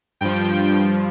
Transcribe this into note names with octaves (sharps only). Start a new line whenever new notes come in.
G2 F3 G5